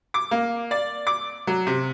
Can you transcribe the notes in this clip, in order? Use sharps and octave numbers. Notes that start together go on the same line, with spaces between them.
D6
A#3
D5
D6
F#3
C3